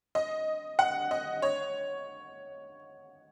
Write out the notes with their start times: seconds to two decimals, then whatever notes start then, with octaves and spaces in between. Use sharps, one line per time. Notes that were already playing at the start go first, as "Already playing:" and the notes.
0.15 D#5
0.79 F#5
1.11 D#5
1.42 C#5